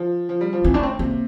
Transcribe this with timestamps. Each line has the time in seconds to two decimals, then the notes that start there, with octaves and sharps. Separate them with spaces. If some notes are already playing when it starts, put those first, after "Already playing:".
Already playing: F3
0.29 F3
0.41 G3
0.53 F3
0.64 E3 C4
0.74 A2 D4
0.83 C4
0.99 C3 A#3